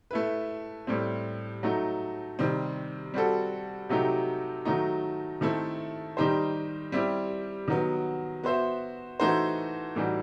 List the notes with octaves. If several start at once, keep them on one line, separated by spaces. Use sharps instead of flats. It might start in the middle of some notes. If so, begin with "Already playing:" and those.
A3 E4 B4
A2 G3 C4
F#3 A3 D#4
C3 D#3 G3 C4
G3 C4 F#4 A4
C3 F#3 A3 D#4 G4
D#3 F#3 A3 D#4
D#3 A3 C4 E4 A4
D#3 G3 D#4 G4 C5
G3 C4 E4 G4
D#3 F#3 B3
B3 F#4 C5 E5
E3 A3 D#4 F#4 C5
A2 E3 G3 D#4 F#4